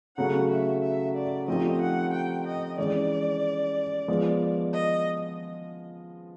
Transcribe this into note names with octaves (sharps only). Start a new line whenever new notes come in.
C#3 F#3 A3 F#5
E5
E5
D5
F3 A3 C4 D#4 G4 D#5
F#5
G5
D#5
E3 G#3 C#4 D5
F3 G#3 B3
D#5